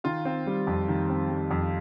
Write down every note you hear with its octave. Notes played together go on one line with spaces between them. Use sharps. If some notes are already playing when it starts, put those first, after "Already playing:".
D#3 F4 F5
C4
G3
F2
D#3
C4
G3
F2